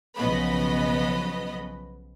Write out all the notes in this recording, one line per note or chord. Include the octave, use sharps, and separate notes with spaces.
B1 C#3 F3 B3 D#5 B5